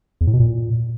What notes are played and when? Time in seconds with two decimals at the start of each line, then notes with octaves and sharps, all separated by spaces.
0.21 E2
0.27 A2
0.33 B2
0.40 A#2